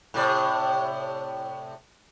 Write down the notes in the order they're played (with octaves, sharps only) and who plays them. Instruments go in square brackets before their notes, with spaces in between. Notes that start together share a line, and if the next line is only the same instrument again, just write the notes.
[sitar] A2 C3 D5